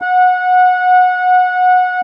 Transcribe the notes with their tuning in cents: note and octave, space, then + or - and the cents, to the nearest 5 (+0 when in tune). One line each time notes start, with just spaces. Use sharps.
F#5 -20